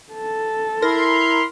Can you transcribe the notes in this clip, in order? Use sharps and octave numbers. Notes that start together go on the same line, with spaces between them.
A4
E4 A#4 B5 C6